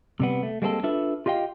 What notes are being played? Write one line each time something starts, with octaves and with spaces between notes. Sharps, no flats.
C3 G3 B3
A3
G3 G#3 A#3 C4 G#4 A4
D4 F4 A4 B4 E5
F4 G4 D#5 F5 G5